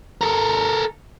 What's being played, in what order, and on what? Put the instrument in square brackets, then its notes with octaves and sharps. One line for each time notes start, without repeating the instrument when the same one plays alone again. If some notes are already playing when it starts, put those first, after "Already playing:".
[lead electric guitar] A4 A#4